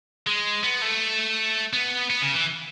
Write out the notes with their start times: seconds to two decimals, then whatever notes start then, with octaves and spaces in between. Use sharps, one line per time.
0.27 G#3
0.64 B3
0.82 A3
1.73 B3
2.10 B3
2.22 C#3
2.34 E3